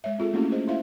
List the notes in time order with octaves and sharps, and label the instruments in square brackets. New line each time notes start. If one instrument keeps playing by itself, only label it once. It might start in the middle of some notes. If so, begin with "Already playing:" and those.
[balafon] G#3 C#5 E5
C4 F4 G#4 A4
A3 A#3 C4 C#4 E4 F#4
G#4 C5 D#5
E4 C5 E5 F5